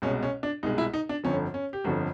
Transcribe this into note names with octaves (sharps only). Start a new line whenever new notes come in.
C2 B2 G#3 C#4
C#4
D4
C2 B2 G#3 D#4
E4
D#4
D4
G1 F2 D3 F3 C#4
C#4
G4
G1 F2 D3 F3 F#4